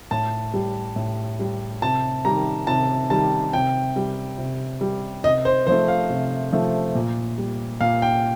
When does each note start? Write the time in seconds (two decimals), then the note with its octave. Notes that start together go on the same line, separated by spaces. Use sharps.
0.11 A2 A5
0.54 G3
0.96 A2
1.39 G3
1.82 C3 A5
2.25 D#3 G3 A#5
2.67 C3 A5
3.10 D#3 G3 A5
3.53 C3 G5
3.96 G3
4.38 C3
4.81 G3
5.24 C3 D#5
5.45 C5
5.67 F3 A3 C5
5.88 F5
6.09 C3
6.52 F3 A3
6.95 A#2
7.38 G3
7.81 A#2 F5
8.02 G5